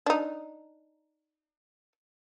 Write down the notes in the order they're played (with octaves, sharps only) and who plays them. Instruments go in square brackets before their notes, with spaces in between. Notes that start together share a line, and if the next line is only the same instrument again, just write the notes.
[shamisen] D4 D#4